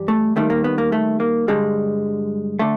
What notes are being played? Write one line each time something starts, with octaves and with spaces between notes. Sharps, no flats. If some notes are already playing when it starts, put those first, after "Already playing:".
Already playing: G2 E3 G3
A3
D#2 D#3 G3 A3
A#3
B3
A#3
A3
A#3
G2 D3 G3 G#3
D3 A3